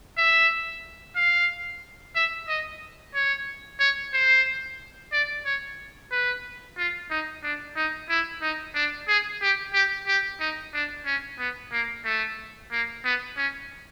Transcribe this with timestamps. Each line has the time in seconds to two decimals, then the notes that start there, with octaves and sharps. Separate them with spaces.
0.18 E5
1.16 F5
2.15 E5
2.48 D#5
3.15 C#5
3.80 C#5
4.14 C5
5.13 D5
5.45 C#5
6.11 B4
6.78 F4
7.10 D#4
7.43 D4
7.76 D#4
8.10 E4
8.42 D#4
8.75 D4
9.08 G#4
9.42 G4
9.74 G4
10.07 G4
10.40 D#4
10.74 D4
11.06 C#4
11.39 B3
11.72 A#3
12.05 A3
12.72 A#3
13.04 B3
13.37 C#4